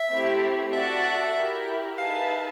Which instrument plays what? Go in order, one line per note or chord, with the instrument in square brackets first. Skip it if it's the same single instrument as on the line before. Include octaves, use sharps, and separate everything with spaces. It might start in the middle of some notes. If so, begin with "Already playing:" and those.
Already playing: [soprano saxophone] E5
[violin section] A3 C4 E4 G4
[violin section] F#4 A4 D5 F#5 A5 [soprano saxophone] E5
[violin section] E4 G4 A#4
[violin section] D#4 G#4 B4 E5 A5 [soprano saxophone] F5